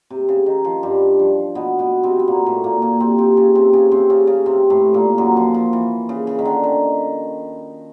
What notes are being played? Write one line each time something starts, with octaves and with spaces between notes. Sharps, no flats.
C3
C#3
D#3
F3
G2 G3
F3
B2 B3
B2 B3
C3 C4
B3
A#2 A#3
A2 A3
A#2 A#3
A#2 A#3
C3 C4
C3 C4
C#3 C#4
C3 C4
C#3 C#4
C3 C4
C#3 C#4
C#3 C#4
C3 C4
A2 A3
A#2 A#3
F#2 F#3
F3
F3
E3
C#3
C#3
D#3
D3
D#3